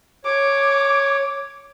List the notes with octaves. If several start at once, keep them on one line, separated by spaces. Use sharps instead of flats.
C#5 D6